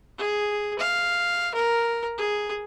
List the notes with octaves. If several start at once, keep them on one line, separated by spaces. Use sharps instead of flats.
G#4
F5
A#4
G#4